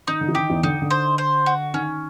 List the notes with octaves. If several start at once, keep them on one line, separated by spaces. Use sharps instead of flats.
D#3 D#4
D3
E3
D#3 G4
E2 E3
D3 D#4
D3
C5
C5
F#4
D#3 C#4